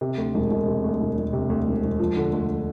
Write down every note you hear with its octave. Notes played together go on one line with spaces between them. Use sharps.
C3
D2
E1
E1
C3
D2
E1
E1
C3
D2
E1
E1
F3
D3
D2